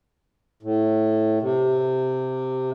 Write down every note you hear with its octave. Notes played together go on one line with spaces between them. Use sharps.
A2
C3